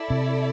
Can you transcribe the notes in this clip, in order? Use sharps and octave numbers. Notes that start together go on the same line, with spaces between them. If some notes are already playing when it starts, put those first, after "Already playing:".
Already playing: E4 A4 D5
C3